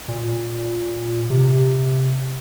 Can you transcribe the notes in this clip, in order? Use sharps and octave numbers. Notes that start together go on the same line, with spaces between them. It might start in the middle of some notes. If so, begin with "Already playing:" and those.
A#2
C3